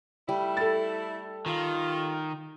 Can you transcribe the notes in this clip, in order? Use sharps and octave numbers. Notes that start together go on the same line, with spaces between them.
G3 A3 E4
A4 A6
D#3 F4